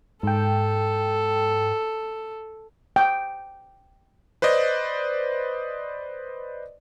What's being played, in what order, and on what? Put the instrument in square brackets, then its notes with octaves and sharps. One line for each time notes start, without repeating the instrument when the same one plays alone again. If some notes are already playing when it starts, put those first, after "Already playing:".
[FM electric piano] G#2 G5 [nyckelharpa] A4
[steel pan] G5
[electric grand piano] B4 C5 D5 D#5